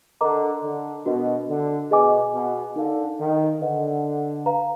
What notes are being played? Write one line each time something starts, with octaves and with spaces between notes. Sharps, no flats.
D3 A#4 D#5 A#5 D6
D3
B2 D4 F#4 A#4 D#5
D3
B2 G#4 D#5 G#5 D6
B2
D3 D#4 A#4 F5
D#3
D3 B4 D#5 F#5
B4 F5 A#5